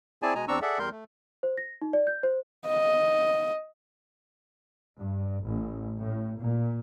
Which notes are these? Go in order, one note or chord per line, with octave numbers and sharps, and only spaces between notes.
C4 E4 G#4 D5 G#5 A5
B2 G#3 D#5 G#5 A#5
E2 C4 D4 A#5 C#6 E6
G#4 A4 D5 E5 F#5
E2 G3 A#4 C6 G6
A3
C5
A#6
D#4
D5
G6
C5
D#5
G2
A1
A2
A#2